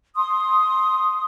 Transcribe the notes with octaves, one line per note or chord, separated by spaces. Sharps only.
C6 D#6